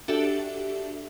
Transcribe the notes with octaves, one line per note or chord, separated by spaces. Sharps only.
D4 F#4 G4 A4 E5